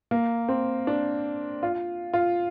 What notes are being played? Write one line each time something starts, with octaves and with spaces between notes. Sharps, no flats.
A#3
C4
D4
F4
F4